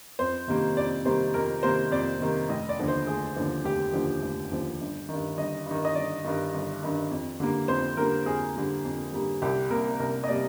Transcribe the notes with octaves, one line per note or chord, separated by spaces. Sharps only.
F2 C5
C3 D#3 G3 A#3
F2 D5
C3 D#3 G3 A#3 C5
F2 A#4
C3 D#3 G3 A#3 C5
F2 D5
C3 D#3 G3 A#3
F1 D#5
D5
D#2 D3 F3
C5
F1 G#4
D#2 D3 F3
F1 G4
D#2 D3 F3
F1
D#2 D3 F3
G1
G2 D#3
G1 D#5
G2 D#3
D#5
G1 D5
G2 D#3
G1
G2 D#3
F2
D3 G3 A#3
F2 C5
D3 G3 A#3 A#4
F2 G#4
D3 G3 A#3
F2
D3 G3 A#3
C2 G4
C3 G3 A#3 A#4
C2 A#4
D#5
C3 G3 A#3 D5